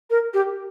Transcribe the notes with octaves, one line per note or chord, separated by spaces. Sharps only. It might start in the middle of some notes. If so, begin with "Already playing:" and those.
A#4
G4